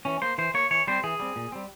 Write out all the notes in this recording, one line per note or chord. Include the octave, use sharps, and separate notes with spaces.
E3 C#4
A#3 C5
E3 C5
A#3 C#5
E3 C#5
G3 C4 C5
E3 G#4
G3 C4
A#2
G3 C4